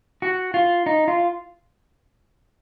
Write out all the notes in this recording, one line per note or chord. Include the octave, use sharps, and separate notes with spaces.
F#4
F4
D#4
F4